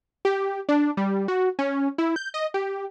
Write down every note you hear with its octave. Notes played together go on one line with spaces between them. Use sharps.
G4
D4
G3
F#4
C#4
E4
G6
D#5
G4